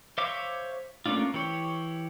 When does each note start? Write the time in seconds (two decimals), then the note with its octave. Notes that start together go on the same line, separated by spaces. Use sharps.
0.18 C5 C#5 E5 F5 D6
1.06 A3 A#3 C#4 D4 F4
1.34 E3 G4 C#5